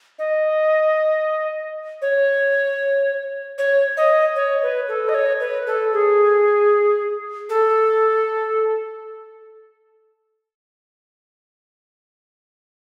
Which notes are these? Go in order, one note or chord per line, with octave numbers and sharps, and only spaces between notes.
D#5
C#5
C#5
D#5
C#5
B4
A4
D#5
C#5
B4
A4
G#4
A4